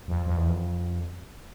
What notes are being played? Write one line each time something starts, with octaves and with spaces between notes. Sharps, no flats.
F2
F2
E2
F2